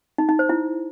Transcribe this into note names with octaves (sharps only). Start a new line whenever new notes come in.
D#4
D#4
C5
E4